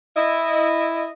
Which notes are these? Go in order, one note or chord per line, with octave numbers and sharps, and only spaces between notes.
E4 D#5